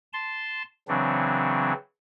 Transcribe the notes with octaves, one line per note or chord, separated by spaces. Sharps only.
A5 C6
C#3 E3 F#3 C4 D4